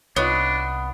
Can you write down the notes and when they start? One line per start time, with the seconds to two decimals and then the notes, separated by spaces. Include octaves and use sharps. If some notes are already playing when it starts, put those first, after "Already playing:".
0.16 C2 B3 D4 D#4 F4 C#5